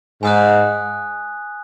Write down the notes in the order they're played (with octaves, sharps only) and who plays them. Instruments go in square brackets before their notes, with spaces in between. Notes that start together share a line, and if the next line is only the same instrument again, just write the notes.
[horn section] G#2 [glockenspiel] G#5 D#6 F#6